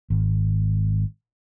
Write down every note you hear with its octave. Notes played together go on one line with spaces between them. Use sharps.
G#1